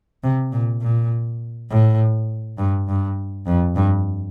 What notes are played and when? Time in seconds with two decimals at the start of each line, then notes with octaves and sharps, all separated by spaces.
0.23 C3
0.52 A#2
0.81 A#2
1.70 A2
2.58 G2
2.88 G2
3.47 F2
3.76 G2